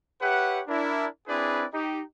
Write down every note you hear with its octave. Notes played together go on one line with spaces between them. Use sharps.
G4 B4 C#5 E5 F#5
D4 E4 A#4
C4 D4 E4 G#4 B4 D5
D#4 G4